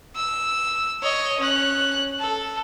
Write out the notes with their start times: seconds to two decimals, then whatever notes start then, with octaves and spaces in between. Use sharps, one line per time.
0.16 E6
1.02 C#5 D#5
1.40 C#4 F#6
2.20 A4